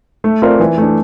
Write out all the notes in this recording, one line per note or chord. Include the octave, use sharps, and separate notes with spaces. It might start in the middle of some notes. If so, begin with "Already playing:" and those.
A3
C4 F4 A#4 D5
E3
A3 D4